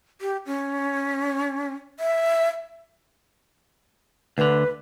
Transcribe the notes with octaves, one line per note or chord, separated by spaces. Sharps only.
G4
C#4
E5
D2 D3 B4